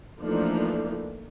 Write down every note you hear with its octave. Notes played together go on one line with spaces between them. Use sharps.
E3 F3 A3 A#3 D4 D#4